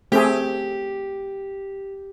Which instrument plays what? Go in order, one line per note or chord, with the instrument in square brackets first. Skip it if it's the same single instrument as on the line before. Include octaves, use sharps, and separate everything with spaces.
[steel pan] A3 C4 G#4 [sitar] G4